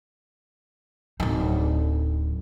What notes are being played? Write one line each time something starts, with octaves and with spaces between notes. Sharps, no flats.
D1 D#4